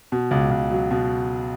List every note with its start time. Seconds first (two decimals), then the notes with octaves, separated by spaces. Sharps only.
0.12 B2
0.31 C#2
0.51 C#2
0.71 F#3
0.91 B2